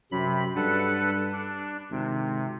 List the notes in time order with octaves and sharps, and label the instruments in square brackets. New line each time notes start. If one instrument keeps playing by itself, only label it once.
[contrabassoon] F#2 [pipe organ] C3 B5
[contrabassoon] G2 [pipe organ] A4 B4 F#5
[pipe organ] D4
[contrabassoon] G#1 [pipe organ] C3